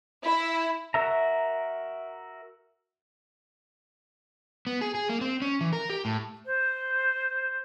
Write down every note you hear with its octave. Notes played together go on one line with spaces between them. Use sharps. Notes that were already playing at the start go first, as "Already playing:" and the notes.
E4
F#4 A#4 E5 A#5
B3
G#4
G#4
A#3
C4
C#4
E3
A#4
G4
A2
C5